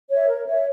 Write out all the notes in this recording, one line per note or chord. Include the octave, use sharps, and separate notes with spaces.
C#5 E5
A#4
C#5 E5